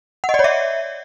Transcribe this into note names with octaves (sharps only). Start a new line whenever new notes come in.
F#5
D#5
D5
C#5
E5